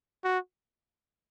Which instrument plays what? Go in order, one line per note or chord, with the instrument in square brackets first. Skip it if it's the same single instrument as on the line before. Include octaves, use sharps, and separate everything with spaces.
[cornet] F#4